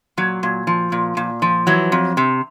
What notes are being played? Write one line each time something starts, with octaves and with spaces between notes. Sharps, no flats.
A#2 F#3
A#2
F3
A#2
A#2
F3
E3 F#3
F2
C3